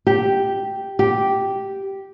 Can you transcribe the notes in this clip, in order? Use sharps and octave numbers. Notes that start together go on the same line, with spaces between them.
G4
G4